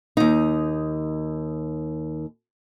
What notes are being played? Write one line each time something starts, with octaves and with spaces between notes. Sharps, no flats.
D#2 D#4